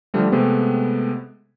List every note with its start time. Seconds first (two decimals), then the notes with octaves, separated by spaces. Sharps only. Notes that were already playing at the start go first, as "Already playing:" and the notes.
0.14 D3 F3 G3 A3
0.32 C3 G#3 A3 B3 C4